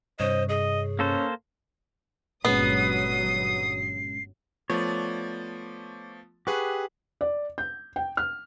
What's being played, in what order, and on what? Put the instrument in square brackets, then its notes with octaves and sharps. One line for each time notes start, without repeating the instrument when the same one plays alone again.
[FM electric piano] G2 C3 C#5 [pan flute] C5 [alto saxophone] D#5
[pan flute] G#4 [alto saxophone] D#5
[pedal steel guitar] A#3 A4 C5 [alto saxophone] C#4
[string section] G1 F#3 D#6 [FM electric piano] A#2 G#3 C#4 [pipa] B3 [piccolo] C7
[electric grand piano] F3 A3 B3 [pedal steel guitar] C#5 D5
[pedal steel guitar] G4 F#5 [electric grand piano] G#4 B4 C#6
[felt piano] D5
G6
G5
F6